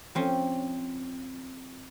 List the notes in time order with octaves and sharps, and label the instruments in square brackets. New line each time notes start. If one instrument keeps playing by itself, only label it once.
[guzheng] F3 C4 C#4